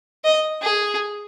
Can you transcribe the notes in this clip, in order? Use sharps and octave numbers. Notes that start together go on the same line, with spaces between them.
D#5
G#4